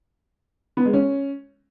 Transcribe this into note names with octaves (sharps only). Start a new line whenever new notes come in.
B3
G#3
C#4